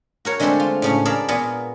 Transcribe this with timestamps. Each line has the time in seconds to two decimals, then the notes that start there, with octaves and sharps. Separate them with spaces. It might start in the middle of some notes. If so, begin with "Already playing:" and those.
0.25 F#4 A#4 C#5
0.39 D3 G#3 A3 C4 A4 C5
0.60 F4
0.82 A2 C#3 C#4
1.05 G#4 A#4 D5 F5 A5 B5
1.28 A#2 B3 G#4 A#4